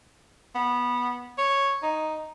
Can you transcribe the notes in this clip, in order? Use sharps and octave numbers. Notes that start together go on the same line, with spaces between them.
B3
C#5
D#4